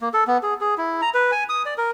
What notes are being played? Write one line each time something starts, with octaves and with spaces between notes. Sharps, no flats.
A#3
A4
B3
G#4
G#4
E4
A#5
B4
G#5
D#6
D5
A#4